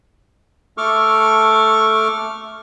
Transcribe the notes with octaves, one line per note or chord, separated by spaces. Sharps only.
A3 A4 C#6 D6 F6